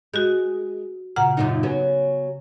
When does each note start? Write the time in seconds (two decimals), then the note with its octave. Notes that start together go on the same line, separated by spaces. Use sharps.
0.14 G#3 F#4 G6
1.16 A#2 C#3 F#5 A#5
1.37 F#2 A#2 D#4
1.63 F#3 B3 C#4